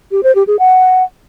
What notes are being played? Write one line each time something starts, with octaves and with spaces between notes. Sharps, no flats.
G4
C5
G4
G#4
F#5